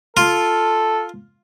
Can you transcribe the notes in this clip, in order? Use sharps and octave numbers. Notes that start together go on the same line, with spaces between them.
F4 A4